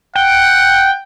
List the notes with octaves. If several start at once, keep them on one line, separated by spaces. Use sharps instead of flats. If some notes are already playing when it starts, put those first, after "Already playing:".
F#5 G5